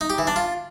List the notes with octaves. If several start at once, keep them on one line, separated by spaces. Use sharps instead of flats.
D#4
G4
E3
D4
F4